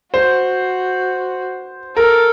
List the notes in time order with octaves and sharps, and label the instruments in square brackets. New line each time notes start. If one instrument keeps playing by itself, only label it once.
[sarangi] F#4 [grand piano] C5
[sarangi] A4 [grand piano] A#4